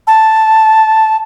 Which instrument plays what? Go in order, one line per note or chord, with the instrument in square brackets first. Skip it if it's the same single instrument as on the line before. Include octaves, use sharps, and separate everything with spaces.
[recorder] A5